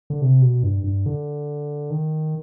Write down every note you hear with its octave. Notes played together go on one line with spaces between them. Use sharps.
D3
C3
B2
G2
G2
D3
D#3